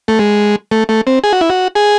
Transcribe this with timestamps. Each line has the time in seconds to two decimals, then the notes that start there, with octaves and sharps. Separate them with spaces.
0.08 A3
0.19 G#3
0.71 A3
0.89 A3
1.07 C4
1.24 G#4
1.33 F#4
1.41 E4
1.50 F#4
1.75 G#4